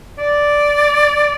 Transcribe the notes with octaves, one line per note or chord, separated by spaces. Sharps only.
D5